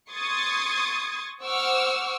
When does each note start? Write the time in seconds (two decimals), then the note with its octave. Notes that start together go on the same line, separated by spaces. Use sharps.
0.11 C6 C#6 D#6 G#6 A6
1.41 C5 F#5 C#6 D6 E6 F6